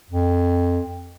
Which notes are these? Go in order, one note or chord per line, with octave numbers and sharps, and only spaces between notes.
F2